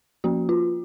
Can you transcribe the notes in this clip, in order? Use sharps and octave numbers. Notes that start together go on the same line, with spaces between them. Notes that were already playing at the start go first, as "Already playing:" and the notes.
F3 A#3 C#4 F#4
F4